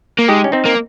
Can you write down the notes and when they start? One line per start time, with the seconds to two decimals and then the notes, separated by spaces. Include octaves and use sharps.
0.19 A#3
0.28 G#3 D#4 G4
0.44 C#4
0.52 C4 D#4
0.65 A#3